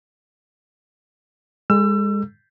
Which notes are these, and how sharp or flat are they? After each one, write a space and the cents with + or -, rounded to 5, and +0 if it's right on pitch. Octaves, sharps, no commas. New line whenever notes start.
G#3 -35 A4 +0 E6 +30